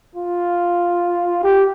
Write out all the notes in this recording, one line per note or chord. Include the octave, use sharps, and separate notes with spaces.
F4
G4